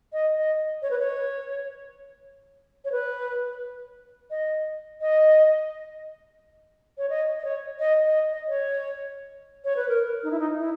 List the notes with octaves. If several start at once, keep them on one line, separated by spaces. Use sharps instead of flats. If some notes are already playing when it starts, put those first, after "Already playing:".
D#5
D#5
C#5
B4
C#5
C#5
B4
D#5
D#5
C#5
D#5
D#5
C#5
D#5
D#5
D#5
C#5
C#5
B4
A#4
D#4
E4
D#4
E4